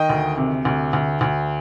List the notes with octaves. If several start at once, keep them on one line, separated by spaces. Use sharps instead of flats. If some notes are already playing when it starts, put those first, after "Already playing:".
Already playing: D#3 D#5 G5
D2
C3
D2
D2
D2